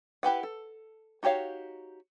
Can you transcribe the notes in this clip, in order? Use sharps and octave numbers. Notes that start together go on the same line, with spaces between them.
E4 G4 B4 F#5
A4
D#4 F#4 G4 C#5 F5